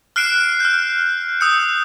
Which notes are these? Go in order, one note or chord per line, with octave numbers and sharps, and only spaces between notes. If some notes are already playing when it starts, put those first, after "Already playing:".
F6 F#6 C7 D7 E7
F6 G6
D#6 E6 G6 C#7